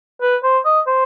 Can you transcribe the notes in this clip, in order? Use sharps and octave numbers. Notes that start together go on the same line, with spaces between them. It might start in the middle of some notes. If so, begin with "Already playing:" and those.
B4
C5
D#5
C5